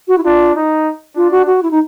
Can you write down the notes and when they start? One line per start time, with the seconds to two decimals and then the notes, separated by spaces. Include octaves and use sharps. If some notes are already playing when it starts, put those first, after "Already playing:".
0.08 F#4
0.18 E4
0.23 D4 F4
0.55 D#4
1.16 D4 F4
1.31 F#4
1.47 F#4
1.63 E4
1.71 D#4